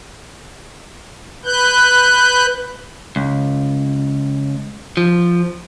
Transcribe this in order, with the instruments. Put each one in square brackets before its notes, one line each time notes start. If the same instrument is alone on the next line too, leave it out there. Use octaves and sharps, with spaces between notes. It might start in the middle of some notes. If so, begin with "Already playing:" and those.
[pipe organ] B4 F#6 G6
[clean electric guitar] C#2
F3